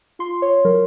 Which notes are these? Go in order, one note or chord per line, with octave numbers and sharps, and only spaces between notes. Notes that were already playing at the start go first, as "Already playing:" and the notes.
F4 C6
C#5
F#3 A#4